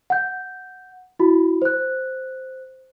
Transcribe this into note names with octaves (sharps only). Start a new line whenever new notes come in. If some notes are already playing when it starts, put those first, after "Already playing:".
F#5 G6
E4 F#4 B5
C5 F#6